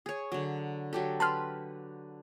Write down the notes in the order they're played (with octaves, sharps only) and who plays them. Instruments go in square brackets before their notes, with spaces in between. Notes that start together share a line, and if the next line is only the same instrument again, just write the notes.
[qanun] G#4 C#5
D3 F#3
F#3 G4 A4
[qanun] B4 B5 [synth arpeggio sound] A5 C6 F6